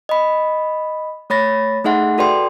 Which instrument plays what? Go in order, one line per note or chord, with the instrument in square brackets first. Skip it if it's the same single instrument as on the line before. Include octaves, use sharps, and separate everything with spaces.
[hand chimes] D#5 B5
A3 C#5 B5 A6 A#6
A3 D#4 G#4 E5 F#5 C6
F#4 A4 B4 D5 G5 C6